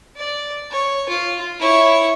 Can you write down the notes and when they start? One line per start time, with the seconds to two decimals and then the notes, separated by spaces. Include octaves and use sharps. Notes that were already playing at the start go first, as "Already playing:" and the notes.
0.16 D5
0.71 C#5
1.09 F4
1.60 E4 C#5